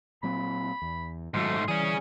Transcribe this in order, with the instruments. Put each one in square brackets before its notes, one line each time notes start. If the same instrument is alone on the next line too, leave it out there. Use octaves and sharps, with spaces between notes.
[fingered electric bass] A#2 F#3 C4 [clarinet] B5
[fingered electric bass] E2
[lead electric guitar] G#2 A3 [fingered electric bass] D#3 F#3 [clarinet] C6
[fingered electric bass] E3 [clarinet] G3 [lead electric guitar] C#4 G#4